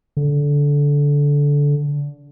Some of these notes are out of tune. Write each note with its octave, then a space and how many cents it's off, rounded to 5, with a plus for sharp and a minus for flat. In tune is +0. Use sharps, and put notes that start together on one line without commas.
D3 -20